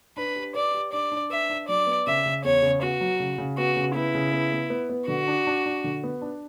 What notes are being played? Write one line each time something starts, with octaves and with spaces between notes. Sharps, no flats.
D4 B4
G4
B4 D5
G4
D4 D5
D4
B4 E5
D4
F#3 D5
B3
C#3 E5
C#3
E2 C#5
C#3
B3 F#4
F#3
C#3
C#3
B3 F#4
C#3
B3 E4
C#3
B3
B3
B3
B3
D3 F#4
D4
D4
D4
D3
B3
D4